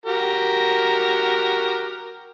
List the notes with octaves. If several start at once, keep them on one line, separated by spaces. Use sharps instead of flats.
F#4 G4 A#4